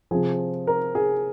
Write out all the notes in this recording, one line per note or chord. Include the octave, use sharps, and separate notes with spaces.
C3 F3 G#4
A#4
G#4